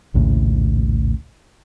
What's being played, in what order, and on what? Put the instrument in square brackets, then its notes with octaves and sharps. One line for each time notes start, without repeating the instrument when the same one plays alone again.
[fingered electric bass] A#1 D#2 A2 C#3